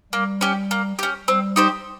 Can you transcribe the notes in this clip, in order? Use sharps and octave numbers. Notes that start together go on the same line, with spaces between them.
G3 A#3
C#4 G4
A#3
C#4 G4
G3 C4
D#4 G4 C5